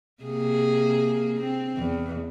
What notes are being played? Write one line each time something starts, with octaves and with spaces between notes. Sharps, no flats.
C3 A#3 G#4
C4
E2